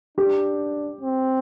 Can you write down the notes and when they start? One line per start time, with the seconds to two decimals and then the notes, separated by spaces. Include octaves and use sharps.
0.18 D4 G4
1.01 C4